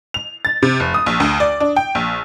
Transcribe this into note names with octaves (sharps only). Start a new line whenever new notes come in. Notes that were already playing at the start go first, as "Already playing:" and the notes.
F7
A6
C3
F1
D#6
A#1
D2
D5
D4
G5
A#1